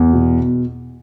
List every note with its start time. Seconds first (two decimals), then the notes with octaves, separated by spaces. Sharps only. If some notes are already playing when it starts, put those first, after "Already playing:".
Already playing: E2
0.13 B2